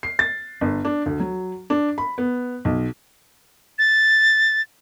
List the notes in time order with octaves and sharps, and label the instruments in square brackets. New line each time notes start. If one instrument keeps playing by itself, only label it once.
[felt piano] C7
A6
G1
D4
D2
F#3
D4
B5
B3
B1
[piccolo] A6